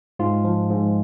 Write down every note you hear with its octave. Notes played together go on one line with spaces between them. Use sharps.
G#2 F4
F3
G#2